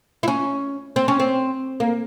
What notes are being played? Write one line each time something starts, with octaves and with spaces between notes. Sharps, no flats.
E4
C#4
C4
C#4
C4
A#3